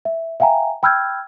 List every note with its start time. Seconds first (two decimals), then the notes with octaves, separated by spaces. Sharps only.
0.05 E5
0.40 E5 F5 G5 G#5 A#5
0.83 G5 B5 E6 F6 G6 G#6